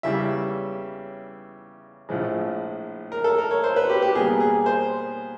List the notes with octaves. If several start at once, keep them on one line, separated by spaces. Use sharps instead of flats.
E2 C#3 E3 G3 E5
A#1 A2 F3 G#3
A#4
A4
A#4
C#5
C5
B4
G4
G4
B2 G3 A#3 G#4
G#4
C5